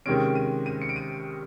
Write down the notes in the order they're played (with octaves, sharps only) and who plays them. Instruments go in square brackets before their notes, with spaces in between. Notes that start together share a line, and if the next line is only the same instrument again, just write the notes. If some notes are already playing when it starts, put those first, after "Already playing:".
[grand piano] C3 D#3 G#3 C#4 D7
D#7
D#7
C#7
D7
D#7